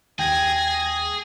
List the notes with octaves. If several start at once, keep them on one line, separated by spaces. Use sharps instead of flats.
D#2 G#4 G5 G#6 A#6